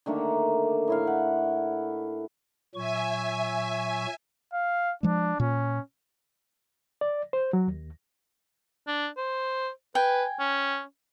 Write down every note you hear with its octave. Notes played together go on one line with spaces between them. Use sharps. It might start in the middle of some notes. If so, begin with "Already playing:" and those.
D3 D#3 A3 A#3
A2 E4 F5
F#5
A#2 F#3 E5 G#5 C#6
F5
F3 G#3 D4
A#2 C#4
D5
C5
F#3
D#2
D4
C5
B4 G5 G#5
C#4